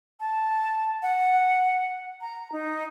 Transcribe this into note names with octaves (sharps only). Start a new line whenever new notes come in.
A5
F#5
A#5
D#4